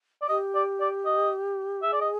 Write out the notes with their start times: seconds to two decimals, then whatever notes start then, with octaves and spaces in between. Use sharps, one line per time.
0.22 D5
0.29 G4 D#5
0.55 D5
0.80 D5
1.06 D#5
1.83 G#4 E5
1.93 D5
2.01 D#5